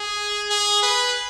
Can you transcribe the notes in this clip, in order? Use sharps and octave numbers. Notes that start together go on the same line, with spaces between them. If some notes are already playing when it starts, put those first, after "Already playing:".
Already playing: G#4
G#4
B4